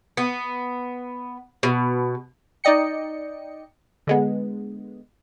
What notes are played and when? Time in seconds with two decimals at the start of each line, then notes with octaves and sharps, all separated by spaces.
0.17 B3
1.63 B2
2.64 D#4 D5 D#5 G5 C#7
4.07 D3 G#3 B3